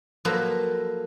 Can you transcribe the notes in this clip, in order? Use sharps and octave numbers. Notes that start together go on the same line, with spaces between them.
F3 F#3 A#3 A4 B4